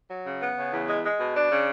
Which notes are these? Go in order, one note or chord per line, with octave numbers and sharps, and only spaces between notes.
F#3
C#3
B3
C#3
E2
G#3
G#3
B2
D4
C#3